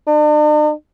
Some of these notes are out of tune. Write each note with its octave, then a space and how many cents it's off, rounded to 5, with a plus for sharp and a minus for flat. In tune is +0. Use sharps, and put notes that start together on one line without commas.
D4 +45